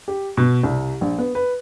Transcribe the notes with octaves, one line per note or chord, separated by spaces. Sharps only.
G4
B2
C2
A#1
B3
B4